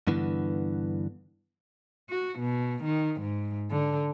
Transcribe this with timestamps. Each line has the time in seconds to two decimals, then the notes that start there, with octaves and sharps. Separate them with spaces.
0.07 G2 D3 E3 B3
2.10 F#4
2.40 B2
2.84 D#3
3.21 G#2
3.71 D3